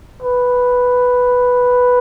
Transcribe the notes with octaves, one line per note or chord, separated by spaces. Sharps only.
B4